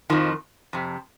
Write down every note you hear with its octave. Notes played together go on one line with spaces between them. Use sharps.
F2 D#3 F3
F2 C3